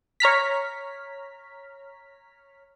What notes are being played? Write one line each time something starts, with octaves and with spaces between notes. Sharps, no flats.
C#5 A#5 F6 B6